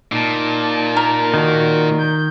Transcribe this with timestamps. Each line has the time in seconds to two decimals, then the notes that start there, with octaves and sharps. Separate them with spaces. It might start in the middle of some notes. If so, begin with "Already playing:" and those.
0.12 A#2 D#4 A5
0.97 A#4
1.34 D#3 F#4
1.99 G6